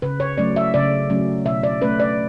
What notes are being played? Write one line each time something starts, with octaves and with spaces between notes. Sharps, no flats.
C#3 B4
C#5
F#3 A3 C#4 D5
E5
C#3 D5
F#3 A3 C#4
B2 E5
D5
A3 C#4 B4
D5